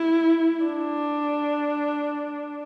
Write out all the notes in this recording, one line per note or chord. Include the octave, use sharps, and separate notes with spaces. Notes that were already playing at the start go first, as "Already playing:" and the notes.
Already playing: E4
D4